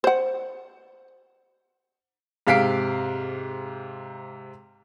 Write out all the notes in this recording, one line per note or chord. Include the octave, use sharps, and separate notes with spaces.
C5 F#5
G#2 C3 F5 B6 C7 D7